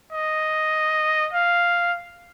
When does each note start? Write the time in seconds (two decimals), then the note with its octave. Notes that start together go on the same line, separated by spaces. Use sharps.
0.12 D#5
1.33 F5